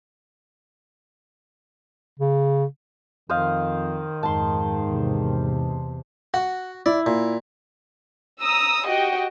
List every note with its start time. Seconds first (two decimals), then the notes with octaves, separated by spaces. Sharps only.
2.19 C#3
3.30 F2 D#3 C5 D#5 F5
4.23 F2 G#2 A5 C6
4.87 E2 C3
6.34 F#4 F#5
6.86 E4 D5
7.06 A#2
8.41 A#5 D#6 E6
8.87 F#4 G4 D#5 G5